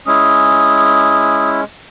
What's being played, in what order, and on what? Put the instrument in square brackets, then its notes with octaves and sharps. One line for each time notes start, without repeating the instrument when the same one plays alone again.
[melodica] G#3 C#4 E4 [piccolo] D#6